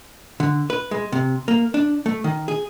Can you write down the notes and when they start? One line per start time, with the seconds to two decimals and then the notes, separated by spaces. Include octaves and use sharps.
0.40 D3
0.70 B4
0.91 G#3
1.12 C3
1.48 A#3
1.74 D4
2.06 A3
2.24 D#3
2.48 G#4